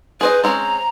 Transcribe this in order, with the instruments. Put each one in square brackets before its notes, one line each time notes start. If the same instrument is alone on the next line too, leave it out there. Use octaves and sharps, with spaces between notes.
[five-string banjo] G#4 C5 D#5 [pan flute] B4
[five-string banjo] G#3 C4 C#4 [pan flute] A#5